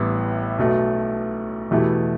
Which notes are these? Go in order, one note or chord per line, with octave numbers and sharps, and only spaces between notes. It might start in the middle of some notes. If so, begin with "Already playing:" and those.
Already playing: A1 A2 G3 B3
B1 B2 A3
E2 B2 A3 E4 G4